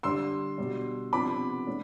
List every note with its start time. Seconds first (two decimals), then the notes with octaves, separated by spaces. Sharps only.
0.03 D3 G3 D4 C6 E6
0.58 B2 G3 D4
1.13 C3 F3 B3 D4 B5 D6
1.67 A3 D4